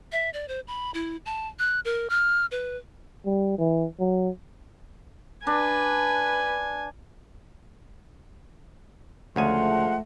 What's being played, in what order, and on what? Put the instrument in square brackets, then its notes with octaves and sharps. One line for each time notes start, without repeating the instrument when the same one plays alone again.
[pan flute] E5
D5
C5
B5
E4
A5
F#6
A#4
F6
B4
[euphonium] G3
E3
F#3
[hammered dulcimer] D4 [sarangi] B4 [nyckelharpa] G#5
[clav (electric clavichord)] D2 C#3 G#5 [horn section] F3 G#3 C6 [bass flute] A3 [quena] F#5